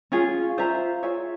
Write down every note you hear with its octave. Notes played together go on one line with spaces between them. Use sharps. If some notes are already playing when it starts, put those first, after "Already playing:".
C#4 F4 G#4
F4 C5 E5 A#5
F4 G#4 C#5 E5